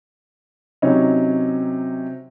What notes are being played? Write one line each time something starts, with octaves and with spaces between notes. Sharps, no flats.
C3 F#3 C#4 D#4